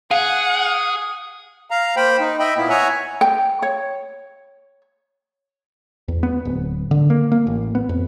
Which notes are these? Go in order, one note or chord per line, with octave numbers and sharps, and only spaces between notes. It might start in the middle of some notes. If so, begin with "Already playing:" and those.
G#4 F5 F#5
F5 A#5
A#3 C5 G5 B5
D#4
D#5 E5 G5 B5
A#2 A#3 B3 E4
C#5 E5 F#5 G#5 A#5
G5
C#5
E2
B3
D1
D3
A#3
A#3
A1
B3
F2